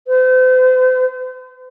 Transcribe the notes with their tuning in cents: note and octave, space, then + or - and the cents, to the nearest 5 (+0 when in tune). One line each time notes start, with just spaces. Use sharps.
C5 -40